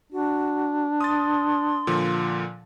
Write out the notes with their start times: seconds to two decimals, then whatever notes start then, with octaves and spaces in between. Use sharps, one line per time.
0.12 D4 F#4
1.01 C6 D#6 A6
1.87 A#2 D3 F3